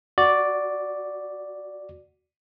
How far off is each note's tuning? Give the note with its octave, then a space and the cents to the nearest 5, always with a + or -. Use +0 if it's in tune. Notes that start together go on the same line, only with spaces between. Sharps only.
F#4 +0 D5 +0